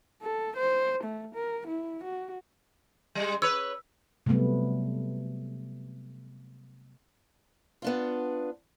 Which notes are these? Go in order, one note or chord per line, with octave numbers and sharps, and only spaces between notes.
A4
C5
A3
A#4
E4
F#4
G3 G#3
B4 C#5 E6
C3 F#3 G3 A3 B3
B3 D4 F4